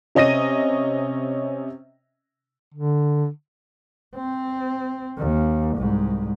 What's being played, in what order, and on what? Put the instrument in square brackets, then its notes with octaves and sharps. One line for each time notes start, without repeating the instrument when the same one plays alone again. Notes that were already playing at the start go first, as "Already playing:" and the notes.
[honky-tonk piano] C3 C#4 D#5 A#6 D#7
[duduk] D3
[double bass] C4
D#2
C2 G#2